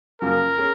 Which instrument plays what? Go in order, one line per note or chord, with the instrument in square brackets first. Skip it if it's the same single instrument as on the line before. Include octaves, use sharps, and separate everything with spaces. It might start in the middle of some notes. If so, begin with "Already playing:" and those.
[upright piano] F#2 C#3 F3 A#3 F4 [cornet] A#4
[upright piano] C#4 G#4